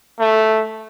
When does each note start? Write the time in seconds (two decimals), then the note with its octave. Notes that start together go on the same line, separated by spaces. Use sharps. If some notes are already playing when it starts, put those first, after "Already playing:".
0.19 A3